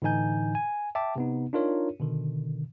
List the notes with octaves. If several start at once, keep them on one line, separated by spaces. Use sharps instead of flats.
A2 D3 E3 D#4 G#5 G6
G#5
E5 G5 A5 D6
C3 B3 D#4
D4 D#4 F4 A#4 C#5
B2 D3 D#3